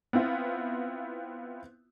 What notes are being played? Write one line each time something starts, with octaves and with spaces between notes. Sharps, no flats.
B3 C4 E4 F4